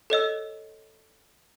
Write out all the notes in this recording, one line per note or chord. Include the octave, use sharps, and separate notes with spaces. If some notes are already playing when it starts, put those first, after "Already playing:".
A4 C#5 D#5 E6